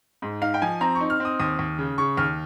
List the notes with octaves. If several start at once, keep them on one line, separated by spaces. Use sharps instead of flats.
G#2
D#4 F5
G5
F3 G#5
C4 A#5
C#6
D#4
F6
C4 D#6
D#2 D#6
D#2
C#3
C#3 C#6
D#2 F6